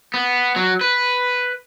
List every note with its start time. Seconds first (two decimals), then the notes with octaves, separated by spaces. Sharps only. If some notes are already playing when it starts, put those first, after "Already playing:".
0.14 B3
0.56 F#3
0.81 B4